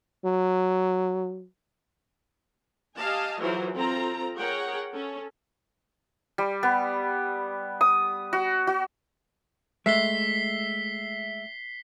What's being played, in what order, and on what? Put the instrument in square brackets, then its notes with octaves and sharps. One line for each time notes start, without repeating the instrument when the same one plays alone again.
[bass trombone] F#3
[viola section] G4 D#5 F5 G#5 A5
E3 F#3 F4 G#4 A#4 C5
C4 F4 A4 A#5
G#4 A#4 C#5 F#5 G5
C#4 A4
[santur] G3
B3
D#6
F#4
F#4
[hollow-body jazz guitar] G#3 A3 [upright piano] E5 [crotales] B6 C7 G7